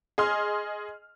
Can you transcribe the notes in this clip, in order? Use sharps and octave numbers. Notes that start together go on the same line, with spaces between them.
G#4 D#5 C6 F6